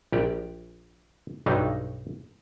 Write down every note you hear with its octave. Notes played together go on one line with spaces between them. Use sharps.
A#1 G4 D5
B1 G2 F#3 G3 D#4